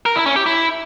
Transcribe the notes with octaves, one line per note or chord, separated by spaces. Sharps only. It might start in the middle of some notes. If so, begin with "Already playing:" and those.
A#4
E4
C#4
G4
E4